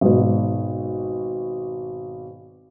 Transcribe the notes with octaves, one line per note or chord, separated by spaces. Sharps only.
G#1 B2